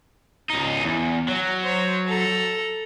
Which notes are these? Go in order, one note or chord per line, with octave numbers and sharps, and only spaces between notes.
C#2 D#4
E2
F#3
C5 C#5
A4 A#5